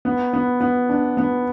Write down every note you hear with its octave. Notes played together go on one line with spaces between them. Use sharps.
B3
B3
B3
D4
B3